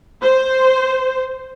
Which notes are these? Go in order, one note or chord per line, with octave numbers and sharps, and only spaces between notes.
C5